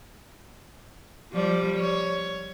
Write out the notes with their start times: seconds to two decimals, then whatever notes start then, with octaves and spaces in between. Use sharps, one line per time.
1.32 F3 G3 D5
1.77 C#5